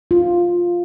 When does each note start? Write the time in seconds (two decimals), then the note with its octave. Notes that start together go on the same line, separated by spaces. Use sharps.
0.11 F4